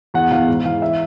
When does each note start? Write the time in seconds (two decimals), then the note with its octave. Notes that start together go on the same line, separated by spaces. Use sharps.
0.14 E2 F#5
0.31 E2 F5
0.48 G#2
0.65 E3 F5
0.82 E5